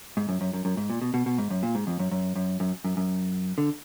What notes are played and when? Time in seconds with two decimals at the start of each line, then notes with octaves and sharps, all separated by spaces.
0.17 G#2
0.29 F#2
0.41 F#2
0.53 F#2
0.65 F#2
0.77 G#2
0.90 A#2
1.02 B2
1.14 B2
1.26 B2
1.38 G#2
1.50 F#2
1.63 A#2
1.75 G#2
1.87 F2
1.99 F#2
2.11 F#2
2.36 F#2
2.60 F#2
2.84 F#2
2.97 F#2
3.58 D3